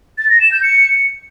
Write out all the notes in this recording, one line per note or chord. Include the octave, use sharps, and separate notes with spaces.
A6
A#6
E7
G6
C#7